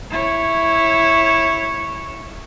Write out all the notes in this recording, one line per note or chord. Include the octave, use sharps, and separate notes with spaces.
E4 C#5